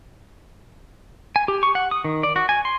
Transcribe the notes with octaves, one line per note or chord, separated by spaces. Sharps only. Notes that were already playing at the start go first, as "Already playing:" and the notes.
G#5
G4
C#6
F#5
D#6
D#3
D5
F#4
G#5
C6